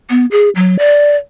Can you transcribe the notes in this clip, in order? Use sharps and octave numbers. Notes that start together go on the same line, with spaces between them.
B3
G#4
F#3
D5